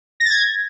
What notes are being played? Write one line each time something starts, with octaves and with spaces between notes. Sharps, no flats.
A#6
A6
G#6